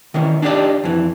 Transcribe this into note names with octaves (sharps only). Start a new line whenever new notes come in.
D#3 E3 C#4
D4 D#4 F4 G4 B4 D5
F2 E3